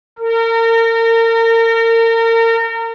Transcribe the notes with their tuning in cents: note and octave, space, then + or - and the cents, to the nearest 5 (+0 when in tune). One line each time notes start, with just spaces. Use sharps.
A#4 -35